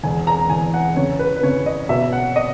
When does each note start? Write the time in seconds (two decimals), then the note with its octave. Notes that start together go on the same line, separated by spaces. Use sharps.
0.03 E1 G#5
0.27 A#5
0.50 E2 G#5
0.74 F#5
0.96 C#3 C#5
1.19 B4
1.36 B4
1.43 C#3 C#5
1.66 D#5
1.89 B2 E5
2.13 F#5
2.36 D#5